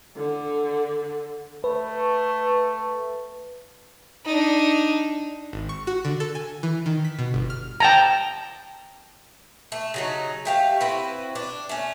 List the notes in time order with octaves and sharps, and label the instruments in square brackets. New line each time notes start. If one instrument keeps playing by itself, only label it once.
[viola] D3
[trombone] A3 [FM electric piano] B4
[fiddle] D4 D#4
[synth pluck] G#1
C#6
F#4
D3
A4
G#5
E3
D#3
B6
B2
G1
F6
[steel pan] G5 A5 A#5
[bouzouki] A3
C#3 F#3 D#4
A3 G4 F5
C4 E4 F#4 B4
D4
A3 C#4